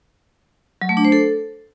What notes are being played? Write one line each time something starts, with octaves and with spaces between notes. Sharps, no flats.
F#3
A3
D4
C5
A4